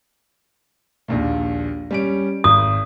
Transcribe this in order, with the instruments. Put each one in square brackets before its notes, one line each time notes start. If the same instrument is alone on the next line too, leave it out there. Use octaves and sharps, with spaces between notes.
[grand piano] A#1 D#2 A#2
G3 C#4 D7
[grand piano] G#1 [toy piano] D#6